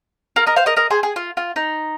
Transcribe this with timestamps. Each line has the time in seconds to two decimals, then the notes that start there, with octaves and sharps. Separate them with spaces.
0.36 F4 A#4
0.46 A#4 D#5
0.56 C5 F5
0.66 A#4 D#5
0.77 A#4 D#5
0.90 G#4 C5
1.03 G#4
1.16 F4
1.37 F4
1.56 D#4